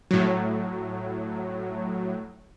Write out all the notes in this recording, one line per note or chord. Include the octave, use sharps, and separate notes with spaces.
A2 F#3